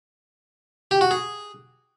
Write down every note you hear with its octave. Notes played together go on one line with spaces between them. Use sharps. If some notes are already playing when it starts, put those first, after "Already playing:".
G4
F#4
G#4